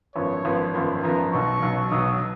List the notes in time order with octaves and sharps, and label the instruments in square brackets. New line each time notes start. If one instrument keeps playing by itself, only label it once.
[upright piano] G#1 F#2 F3 B3 [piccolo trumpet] C#5
[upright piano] G#1 F#2 F3 B3
G#1 F#2 F3 B3
[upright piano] G#1 F#2 F3 B3 [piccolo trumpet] A#5
[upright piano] B1 B2 F#3 [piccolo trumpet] C#6
[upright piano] B1 B2 F#3
[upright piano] B1 B2 F#3 [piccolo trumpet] D#6